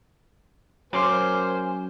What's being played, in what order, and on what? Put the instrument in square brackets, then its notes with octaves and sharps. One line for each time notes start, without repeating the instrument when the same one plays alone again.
[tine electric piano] F#3 C#4 [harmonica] A#3 C5 [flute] G#5 [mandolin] C6 D6